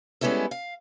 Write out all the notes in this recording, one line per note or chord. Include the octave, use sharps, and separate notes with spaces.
G3 G#3 B3 C#4 E4 A4
F5